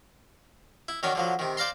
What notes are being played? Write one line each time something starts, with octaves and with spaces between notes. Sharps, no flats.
E4
D#3 F#3 C#4 D4
D3 F3 F#3
C3 D#3
C5 D5 F5 A#5 C6